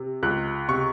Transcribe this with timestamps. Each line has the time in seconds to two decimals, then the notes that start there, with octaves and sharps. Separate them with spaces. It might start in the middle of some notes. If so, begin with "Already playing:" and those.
Already playing: C3
0.23 C#2 F#6
0.69 C3 C#6